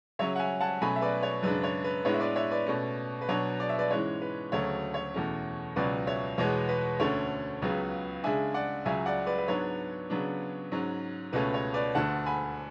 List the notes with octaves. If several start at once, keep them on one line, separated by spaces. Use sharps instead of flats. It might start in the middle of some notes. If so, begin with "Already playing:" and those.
C#3 F#3 C#4 C#5 E5
F#5
E5 G#5
F#5 A5
B2 F#3 A3 C#4 G#5 B5
E5
B4 D5
C#5
F#2 C#3 G#3 D4 B4
C#5
B4
A2 G#3 B3 D4 C#5
E5
B4 D5
C#5 E5
B4 D5
B2 A3 C#4
B4
B2 F#3 B3 D4 C#5
D5
E5
B4 D5
G#2 E3 G#3 C#4 C#5
B4
D2 C#3 F#3 A3 C#5
C#5
E2 B2 A3 C#4
C#2 B2 F#3 C#4 B4 D5
C#5 E5
E2 B2 G#3 B3 C#5
B4
D2 D3 A3 C#4 C#5
C#2 C#3 F#3 B3
C#3 G#3 D4 E5 G#5
D5 F#5
C#2 C#3 F#3 C#4 E5 G#5
D5 F#5
B4 D5
B4
G#2 F#3 B3 D4 C#5
C#3 F#3 B3 D4
G#2 F#3 C#4
C#2 B2 A3 C#4 B4
C#5
B4 D5
D2 D3 A3 F#5 A5
G#5 B5